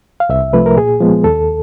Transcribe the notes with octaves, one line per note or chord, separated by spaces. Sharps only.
F5
C2 E5
C3 F3 A3 B4
A#4
A#2 G#4
F3 G#3 B3
D#2 A4